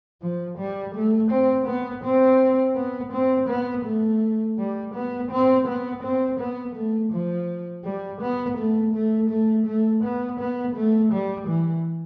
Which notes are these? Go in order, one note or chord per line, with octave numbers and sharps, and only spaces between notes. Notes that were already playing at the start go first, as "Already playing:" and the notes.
F3
G3
A3
C4
B3
C4
B3
C4
B3
A3
G3
B3
C4
B3
C4
B3
A3
F3
G3
B3
A3
A3
A3
A3
B3
B3
A3
G3
E3